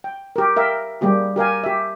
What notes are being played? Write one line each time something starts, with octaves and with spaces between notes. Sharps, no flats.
G5
G4 A#4
A#4 E5 F5 G5
G3 A#3 G4 G#4
G4 A#4 F5 G#5
G4 E5